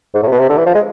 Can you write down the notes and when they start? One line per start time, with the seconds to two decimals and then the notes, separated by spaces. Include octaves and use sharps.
0.14 G#2
0.23 A2
0.27 C3
0.31 B2
0.40 C3
0.49 D3
0.58 E3
0.66 F3
0.75 G#3